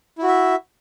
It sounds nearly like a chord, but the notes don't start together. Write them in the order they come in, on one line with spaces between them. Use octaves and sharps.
E4 F#4 E5